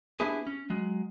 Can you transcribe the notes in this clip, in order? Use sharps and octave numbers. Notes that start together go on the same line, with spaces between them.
B3 D4 E4 G4 G#4
C#4
F#3 G#3